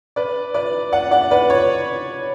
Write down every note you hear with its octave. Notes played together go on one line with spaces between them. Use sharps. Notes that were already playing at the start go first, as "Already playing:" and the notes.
B4 D5
B4 D5
D5 F#5
D5 F#5
B4 D5
C#5